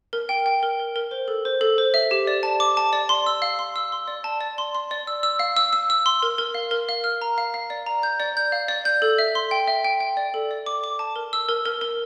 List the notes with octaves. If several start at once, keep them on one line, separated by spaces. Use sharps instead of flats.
A#4
G5
G5
A#4
A#4
A#4
C5
A4
C5
A4
C5
E5
G4
D5
A5
D6
A5
D5
C6
E6
F5
C6
E6
C6
D5
A5
D5
C6
C6
D5
E6
E6
F5
E6
E6
E6
C6
A#4
A#4
F5
A#4
F5
F6
A#5
F5
F5
D5
A#5
G6
D5
G6
F5
D5
G6
A4
E5
C6
G5
E5
G5
G5
D5
A4
D5
D6
D6
A5
A#4
E6
A#4
A#4
A#4